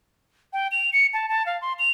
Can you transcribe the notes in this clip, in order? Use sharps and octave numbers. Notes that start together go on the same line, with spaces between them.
G5
F7
C#7
A5
A5
F5
C6
F7